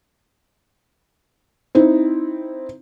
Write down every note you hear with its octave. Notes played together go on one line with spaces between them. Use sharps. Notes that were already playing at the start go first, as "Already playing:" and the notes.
C4 D#4 E4